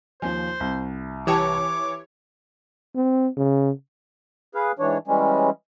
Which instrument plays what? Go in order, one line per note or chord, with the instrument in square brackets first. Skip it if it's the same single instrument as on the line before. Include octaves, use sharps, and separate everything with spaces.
[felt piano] D#2 F3 [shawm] C5 [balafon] G#5
[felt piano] C2
[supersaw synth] E3 C#5 [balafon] G4 G5 A5 [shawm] D6
[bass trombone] C4
C#3
[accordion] G#4 B4 F5
G#2 E3 D4 C#5
E3 G3 G#3 C#4